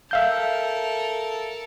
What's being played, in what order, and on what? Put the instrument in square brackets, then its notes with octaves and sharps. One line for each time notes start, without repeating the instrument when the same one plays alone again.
[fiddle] A4 A#4 [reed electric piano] E5 F5 G6